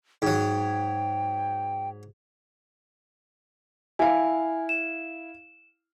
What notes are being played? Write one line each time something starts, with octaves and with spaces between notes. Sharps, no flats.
G#2 F#3 G5
E4 F5 G#5
E7